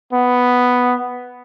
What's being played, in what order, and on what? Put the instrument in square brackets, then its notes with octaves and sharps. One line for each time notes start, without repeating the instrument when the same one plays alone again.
[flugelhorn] B3